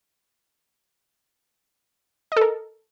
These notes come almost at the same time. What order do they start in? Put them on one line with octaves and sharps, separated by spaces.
D#5 A4 A#4